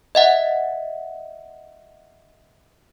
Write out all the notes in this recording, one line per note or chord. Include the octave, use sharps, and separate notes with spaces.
D#5 E5 F#5